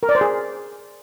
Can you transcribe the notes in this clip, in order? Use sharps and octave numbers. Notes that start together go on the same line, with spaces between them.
A#4
D5
C5
G#4